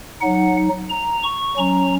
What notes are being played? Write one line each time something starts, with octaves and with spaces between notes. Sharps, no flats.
F#3 D#4 F#5
A#5
C#6
F#3 C#4 A#5